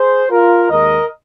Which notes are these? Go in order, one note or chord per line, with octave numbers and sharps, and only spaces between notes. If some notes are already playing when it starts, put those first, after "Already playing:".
Already playing: G#4 C5
F4 A#4
D#2 D#3 G#3 A#4 D#5